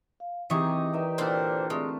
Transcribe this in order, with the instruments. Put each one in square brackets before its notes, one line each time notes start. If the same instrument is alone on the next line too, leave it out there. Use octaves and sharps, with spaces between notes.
[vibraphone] F5
[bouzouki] C3 G#4 [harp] E3 C#6 [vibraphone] C4 [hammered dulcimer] D#4 G4 D#5
[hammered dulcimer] D#4 E5 G5 [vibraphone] A#4 B4 D5
[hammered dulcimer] A#2 D3 A#3 [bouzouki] C4 D4 C5
[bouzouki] G#3 [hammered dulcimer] A3 [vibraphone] C4